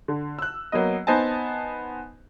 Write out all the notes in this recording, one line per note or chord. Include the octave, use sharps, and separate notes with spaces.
D3
E6 F#6
F#3 A#3 B3 D#5
B3 D#4 C5 D#5 G#5 A5